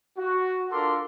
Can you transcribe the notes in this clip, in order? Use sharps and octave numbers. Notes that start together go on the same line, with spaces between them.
F#4
D4 F4 A4 A#4 C6 D6